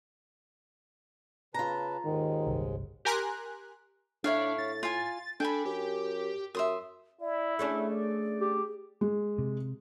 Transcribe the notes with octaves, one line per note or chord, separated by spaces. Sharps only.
C#3 F4 B4 A5 A#5
D#2 G#2 D#3 G#3
G1 C2
G4 A#4 G#5 A#5 C6 F#6
A2 D4 E4 C#5 F5
A6
F4 G#5
D4 A4 G5 G#5 B5
F#2 G4
F#2 E5 C6 D#6
E4 D5
A3 C#4 D4 G#4
D5
G4
G#3
C3